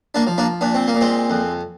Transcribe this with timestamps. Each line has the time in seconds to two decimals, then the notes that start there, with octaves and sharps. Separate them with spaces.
0.15 A#3 D4
0.27 F3
0.38 A#3 D4
0.61 A#2 D4
0.74 C4
0.88 A#3
0.95 A#2
1.01 G#3 C4
1.30 F2